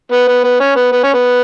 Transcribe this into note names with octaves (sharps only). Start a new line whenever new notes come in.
B3
B3
B3
C#4
B3
B3
C#4
B3